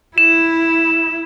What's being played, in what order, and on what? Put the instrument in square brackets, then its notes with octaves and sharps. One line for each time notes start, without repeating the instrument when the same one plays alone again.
[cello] E4 [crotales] E7